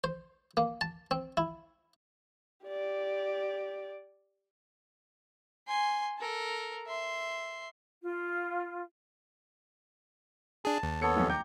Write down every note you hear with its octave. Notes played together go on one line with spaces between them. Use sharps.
C5
A#3
A5
C4
E4
G4 D5
G#5 C6
A4 A#4
E5 C6
F4
D4 G#4 A5
D#2
B3 A4 C#5 A5 C#7
D#1 B1 F2
G5 A#5 D6 G6